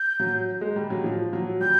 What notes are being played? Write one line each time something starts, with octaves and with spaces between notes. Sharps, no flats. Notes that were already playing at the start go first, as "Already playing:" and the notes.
Already playing: G6
F#3
G#3
G3
F#3
F3
F#3
G3 G6